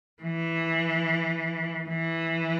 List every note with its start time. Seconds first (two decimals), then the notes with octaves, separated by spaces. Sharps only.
0.23 E3
1.88 E3